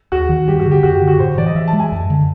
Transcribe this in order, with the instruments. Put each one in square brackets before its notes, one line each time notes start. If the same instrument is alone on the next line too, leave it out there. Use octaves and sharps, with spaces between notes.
[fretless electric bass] D#2 [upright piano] F#4
[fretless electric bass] D#3
[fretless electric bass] G2 [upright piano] G4
[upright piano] F#4
[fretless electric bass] D3
[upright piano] G4
[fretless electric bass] F#2 [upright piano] F#4
[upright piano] G4
[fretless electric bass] D3
[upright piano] F#4
[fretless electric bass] A2 [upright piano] C5
[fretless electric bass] E3 [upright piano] D5
[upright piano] D#5
[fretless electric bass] E3 [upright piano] E5
[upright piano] A5
[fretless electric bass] G#3
[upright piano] G#5
[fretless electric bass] F#2
D3